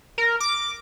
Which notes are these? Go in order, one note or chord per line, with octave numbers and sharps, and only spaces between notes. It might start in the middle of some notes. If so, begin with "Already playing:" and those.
A#4
D6